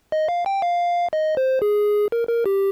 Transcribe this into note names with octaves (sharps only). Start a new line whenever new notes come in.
D#5
F5
G5
F5
D#5
C5
G#4
A#4
A#4
G4